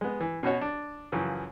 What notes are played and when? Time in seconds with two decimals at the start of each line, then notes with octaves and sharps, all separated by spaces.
0.01 G#3 B3
0.20 E3
0.43 B2 C#4 F#4 C#5
0.61 D4
1.12 F#2 C#3 E3 F3